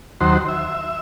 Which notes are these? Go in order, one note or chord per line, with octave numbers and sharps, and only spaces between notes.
D#2 F#3 C5
E5